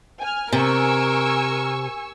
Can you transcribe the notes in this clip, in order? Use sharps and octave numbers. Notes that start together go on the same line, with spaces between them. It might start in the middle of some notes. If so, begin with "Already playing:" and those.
G#5 F6
C3 A#4 G#5 C#6 E6